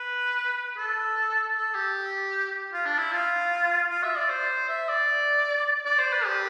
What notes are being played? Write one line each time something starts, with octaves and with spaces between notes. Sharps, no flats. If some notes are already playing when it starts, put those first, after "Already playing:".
Already playing: B4
A4
A4
G4
F4
D4
E4
F4
F4
E5
D5
C5
E5
D5
D5
C5
B4
G4